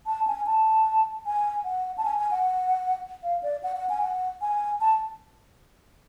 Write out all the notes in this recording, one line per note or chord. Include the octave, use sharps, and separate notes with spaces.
A5
G#5
A5
G#5
F#5
A5
G#5
G#5
F#5
F5
D5
F#5
F#5
G#5
F#5
G#5
A5